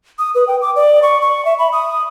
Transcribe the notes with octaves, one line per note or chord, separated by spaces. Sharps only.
D#6
B4
G5
D6
D5
C#6
C#6
E5
B5
D#6